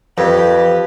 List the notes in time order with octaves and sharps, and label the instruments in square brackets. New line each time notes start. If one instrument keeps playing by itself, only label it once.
[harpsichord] F2 [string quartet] G4 [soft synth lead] B4